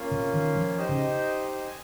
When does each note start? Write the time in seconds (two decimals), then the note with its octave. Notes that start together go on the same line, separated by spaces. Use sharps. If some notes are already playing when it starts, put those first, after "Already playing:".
Already playing: A#3 C#4 F4
0.11 C3
0.34 D#3
0.56 F3
0.78 D#4 G4 C5 D#5
0.89 C#3
1.67 G#5